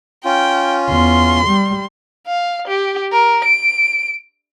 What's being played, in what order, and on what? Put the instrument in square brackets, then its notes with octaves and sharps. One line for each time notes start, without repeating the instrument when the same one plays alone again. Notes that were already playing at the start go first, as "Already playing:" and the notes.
[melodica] C#4 F4 [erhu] G5
[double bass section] E2 [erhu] C6
[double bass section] G3
[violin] F5
G4
A#4
D7